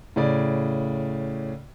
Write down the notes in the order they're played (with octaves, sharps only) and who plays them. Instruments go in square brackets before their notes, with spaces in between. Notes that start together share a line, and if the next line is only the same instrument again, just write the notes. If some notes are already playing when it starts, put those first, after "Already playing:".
[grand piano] A2 C#3 D5